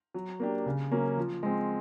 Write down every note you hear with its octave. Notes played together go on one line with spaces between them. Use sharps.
F#3
A#3 D4 G4
C#3
F#3 A#3 C#4
F3
G#3 C4